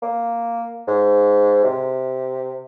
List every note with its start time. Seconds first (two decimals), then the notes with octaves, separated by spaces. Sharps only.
0.02 A#3
0.88 G#2
1.64 C3